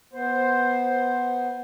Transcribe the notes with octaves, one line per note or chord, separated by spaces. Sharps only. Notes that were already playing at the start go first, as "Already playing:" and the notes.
B3 C5